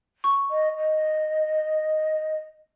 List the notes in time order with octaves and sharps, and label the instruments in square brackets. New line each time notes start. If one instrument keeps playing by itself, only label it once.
[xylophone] C#6
[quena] D#5
D#5